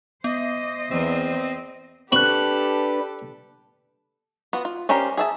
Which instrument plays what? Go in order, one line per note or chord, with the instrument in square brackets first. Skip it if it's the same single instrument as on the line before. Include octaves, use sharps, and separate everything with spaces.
[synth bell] B3 [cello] C5 D#5
[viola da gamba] E2 [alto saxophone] C4
[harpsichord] C4 F#4 [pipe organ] D4 B4 [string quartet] G4 A4 [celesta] F#6 F#7
[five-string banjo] B3 F4 F#4
F4
C#4 D4 G4 A#4 C5
G#4 E5 A5